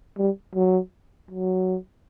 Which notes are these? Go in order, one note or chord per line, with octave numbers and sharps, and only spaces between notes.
G3
F#3
F#3